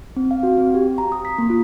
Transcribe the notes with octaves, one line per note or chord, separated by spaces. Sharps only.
C4
F5
F#4
C4
G4
A#5
D#6
B6
A#3
F4